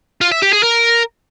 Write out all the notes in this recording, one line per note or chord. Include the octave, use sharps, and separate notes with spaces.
F4
E5
G4
G#4
A#4